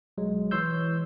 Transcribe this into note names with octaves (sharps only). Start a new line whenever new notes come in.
B1 F#3 G#3
E3 C#5 C6 E6 G6